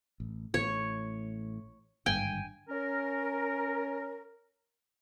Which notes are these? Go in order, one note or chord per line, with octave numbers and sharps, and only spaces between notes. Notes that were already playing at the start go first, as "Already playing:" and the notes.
A1
A1 A2 C#5
G#1 G2 D3 G5 G#5
C#4 A#4